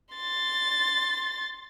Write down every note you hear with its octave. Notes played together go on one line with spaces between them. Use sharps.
C6 A6